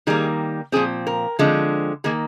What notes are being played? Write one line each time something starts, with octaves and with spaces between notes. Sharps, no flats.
D#3 G3 A#3 G#4
A#2 F3 C4 G#4
A#4
D3 F3 G#3 C4
D#3 A#3 G#4